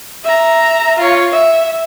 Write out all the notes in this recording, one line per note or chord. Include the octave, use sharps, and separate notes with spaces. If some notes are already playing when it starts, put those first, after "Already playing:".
E5 A#5
F4 C#5
E5